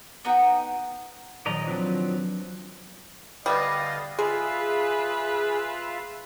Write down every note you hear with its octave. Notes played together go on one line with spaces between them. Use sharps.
B3 D#4 F#4 G5
D#1 F#3 C5 D5 D#5 A#5
F3 F#3 C4 D4 B4
D3 G3 B3 D#5 F5 A6
G#3 F4 G#4 B4 E5 F5